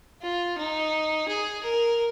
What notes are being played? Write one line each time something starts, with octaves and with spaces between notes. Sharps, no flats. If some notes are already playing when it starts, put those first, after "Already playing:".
F4
D#4
G#4
A#4